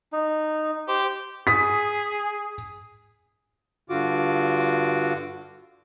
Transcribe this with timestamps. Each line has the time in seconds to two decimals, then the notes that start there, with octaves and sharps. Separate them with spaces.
0.12 D#4
0.88 G4 C5
1.47 G#4 D#6 B6
3.90 G2 D3 F4 F#4 D6